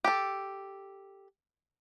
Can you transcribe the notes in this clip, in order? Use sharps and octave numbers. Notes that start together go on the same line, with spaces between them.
G4 A4